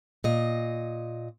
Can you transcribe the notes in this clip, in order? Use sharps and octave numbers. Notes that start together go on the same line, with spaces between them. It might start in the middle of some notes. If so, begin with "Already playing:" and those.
A#2 D#5